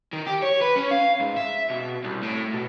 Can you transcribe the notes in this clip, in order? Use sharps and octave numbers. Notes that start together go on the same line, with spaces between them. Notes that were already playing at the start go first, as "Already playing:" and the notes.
D#3
G4
C#5
B4
C#4
F5
G#2
E5
B2
C2
A2
B2